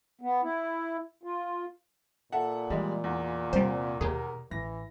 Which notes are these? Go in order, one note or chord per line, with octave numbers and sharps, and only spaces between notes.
B3
E4
F4
A#2 A4 E5 F#5
E3 G3 G#3
E2
C3 G3 C5
D#2 B2 G4 G#4 A#4
A1 E3 A#6